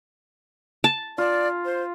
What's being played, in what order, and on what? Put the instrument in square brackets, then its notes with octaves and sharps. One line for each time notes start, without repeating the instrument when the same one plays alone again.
[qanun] A5
[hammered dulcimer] F4 [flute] D5
[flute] C5